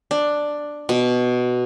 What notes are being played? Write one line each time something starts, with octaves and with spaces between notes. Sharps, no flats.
D4
B2